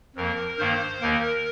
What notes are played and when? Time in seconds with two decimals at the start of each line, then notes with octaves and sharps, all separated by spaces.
0.16 F2 F3 A#3 A#4
0.59 G2 D#3 A#3 C5
1.01 D#2 D#3 A#3 A#4